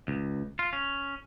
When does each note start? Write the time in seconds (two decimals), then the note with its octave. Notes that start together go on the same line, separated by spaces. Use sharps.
0.08 C#2
0.59 F4
0.73 C#4